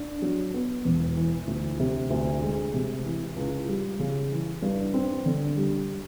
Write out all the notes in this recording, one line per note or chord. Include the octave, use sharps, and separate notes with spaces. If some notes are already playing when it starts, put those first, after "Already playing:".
Already playing: D4
F#3
B3
E1
E3
D2
C3
D2
G#3
C3
E3
C#2
G3
C#3
E3
G2
C4
D3
G3